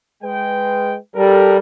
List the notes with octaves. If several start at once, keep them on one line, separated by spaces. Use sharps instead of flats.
G#3 B4 G5
G3 A4 A#4